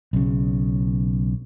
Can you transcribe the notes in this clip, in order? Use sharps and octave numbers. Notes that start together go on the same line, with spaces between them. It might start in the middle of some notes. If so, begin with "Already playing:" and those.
B1 C#3